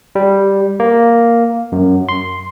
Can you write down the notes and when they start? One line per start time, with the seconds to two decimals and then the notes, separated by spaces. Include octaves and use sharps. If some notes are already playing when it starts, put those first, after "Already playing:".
0.15 G3
0.80 A#3
1.72 F#2
2.09 C6